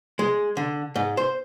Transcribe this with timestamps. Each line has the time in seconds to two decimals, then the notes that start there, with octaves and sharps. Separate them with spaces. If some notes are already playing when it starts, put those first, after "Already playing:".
0.19 G#3
0.57 D3
0.96 G#2
1.17 C5